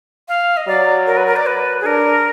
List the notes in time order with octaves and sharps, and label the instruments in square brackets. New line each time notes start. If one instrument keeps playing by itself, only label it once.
[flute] F5
D#5
[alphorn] F#3 [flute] D5
[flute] A#4
B4
A#4
D5
B4
G#4
[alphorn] D4 [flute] A#4